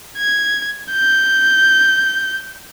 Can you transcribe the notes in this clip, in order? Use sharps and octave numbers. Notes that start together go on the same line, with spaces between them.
G#6
G6